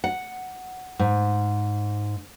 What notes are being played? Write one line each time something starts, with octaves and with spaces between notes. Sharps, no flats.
F#5
G#2